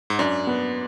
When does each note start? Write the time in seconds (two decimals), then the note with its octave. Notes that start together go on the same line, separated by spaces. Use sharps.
0.10 G#2
0.19 F#2 D4
0.47 B3